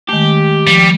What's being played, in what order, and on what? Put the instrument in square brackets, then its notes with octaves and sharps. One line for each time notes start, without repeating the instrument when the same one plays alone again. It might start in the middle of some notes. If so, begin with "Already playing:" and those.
[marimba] D#3 G#3 A3 [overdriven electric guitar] G4
[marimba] F3 [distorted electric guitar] G3